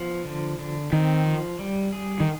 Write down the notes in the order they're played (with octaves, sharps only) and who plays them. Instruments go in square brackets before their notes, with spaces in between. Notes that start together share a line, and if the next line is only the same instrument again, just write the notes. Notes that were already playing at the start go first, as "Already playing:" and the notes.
Already playing: [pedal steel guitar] F3 B3
D3
D3
[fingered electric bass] D#3 [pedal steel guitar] C4
[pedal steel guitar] F3
G3
G#4
[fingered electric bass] D#3